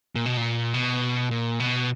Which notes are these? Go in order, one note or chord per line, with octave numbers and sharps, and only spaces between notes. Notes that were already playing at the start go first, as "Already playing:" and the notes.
A#2
B2
A#2
B2
A#2
B2